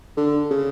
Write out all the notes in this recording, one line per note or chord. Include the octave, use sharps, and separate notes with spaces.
D3
C#3